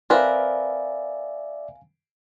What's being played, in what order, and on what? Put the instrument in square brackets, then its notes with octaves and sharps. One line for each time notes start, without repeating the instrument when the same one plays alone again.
[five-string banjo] C4 A#4 B4 [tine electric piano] D5 E5 [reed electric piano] F5 G#5